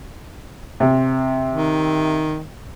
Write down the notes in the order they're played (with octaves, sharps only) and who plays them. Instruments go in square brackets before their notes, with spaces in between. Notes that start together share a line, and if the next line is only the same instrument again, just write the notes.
[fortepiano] C3
[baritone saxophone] D#3